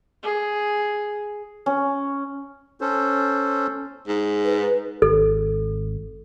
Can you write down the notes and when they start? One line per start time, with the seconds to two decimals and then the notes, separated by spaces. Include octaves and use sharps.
0.23 G#4
1.66 C#4
2.81 C#4 A4 C5
4.08 G#2
4.45 B4
5.02 G#1 A4